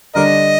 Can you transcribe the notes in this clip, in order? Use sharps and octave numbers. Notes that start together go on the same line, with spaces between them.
D3 G3 D4 A#4 D#5